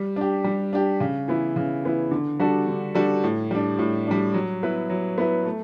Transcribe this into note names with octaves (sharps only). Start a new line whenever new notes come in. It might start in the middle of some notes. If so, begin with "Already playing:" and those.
Already playing: G3
D4 G4
G3
D4 G4
C#3
E3 B3 E4
C#3
E3 B3 E4
D3
G3 D4 F#4 A4
D3
G3 D4 F#4 A4
A2
G3 D4
A2
G3 D4
F#3
B3 E4 B4
F#3
B3 E4 B4
A3